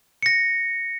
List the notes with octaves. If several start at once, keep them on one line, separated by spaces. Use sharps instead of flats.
A#6 C#7